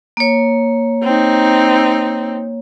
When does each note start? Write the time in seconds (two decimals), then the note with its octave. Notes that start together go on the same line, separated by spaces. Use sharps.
0.17 A#3 C#5
1.03 C4 D#4